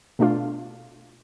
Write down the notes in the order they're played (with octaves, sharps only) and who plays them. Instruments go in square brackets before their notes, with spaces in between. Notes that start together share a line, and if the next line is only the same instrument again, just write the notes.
[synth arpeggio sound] B2 A3 D4 F4